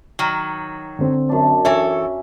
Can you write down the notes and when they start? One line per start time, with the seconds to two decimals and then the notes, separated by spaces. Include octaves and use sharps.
0.19 D#3 F#3
0.99 D3 C4
1.29 F#2 D4
1.65 E3 C#4 A4 C#5 E5